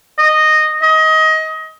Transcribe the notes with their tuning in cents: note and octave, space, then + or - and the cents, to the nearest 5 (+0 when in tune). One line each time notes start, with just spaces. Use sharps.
D#5 -10
D#5 +25